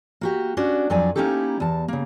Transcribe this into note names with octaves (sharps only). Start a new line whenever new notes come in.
A#3 F#4 G4
C#4 D4 F#4 D5
F2 F#3 D4 D5 G#5
A#3 C#4 D#4 E4 G4 A4
E2 A5
C#3 A#3